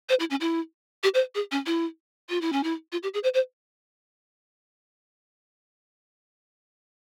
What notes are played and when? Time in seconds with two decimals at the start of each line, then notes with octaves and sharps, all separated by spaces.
0.09 C5
0.20 E4
0.30 C#4
0.40 E4
1.03 G4
1.14 C5
1.35 G#4
1.51 C#4
1.66 E4
2.29 F4
2.41 E4
2.52 C#4
2.63 E4
2.92 F4
3.03 G4
3.14 G#4
3.23 C5
3.34 C5